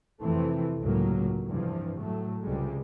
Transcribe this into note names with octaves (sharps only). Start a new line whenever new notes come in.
F2 C3 E3 A3 C4
G1 C#2 A2 F#3 A#3
G2 C3 E3 F3
A2 F#3 A3
C#2 C3 G3 G#3